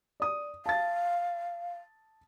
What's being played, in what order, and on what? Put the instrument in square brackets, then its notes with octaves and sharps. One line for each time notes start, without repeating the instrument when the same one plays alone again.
[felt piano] D5 D#6
[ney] F5 [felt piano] A5 A6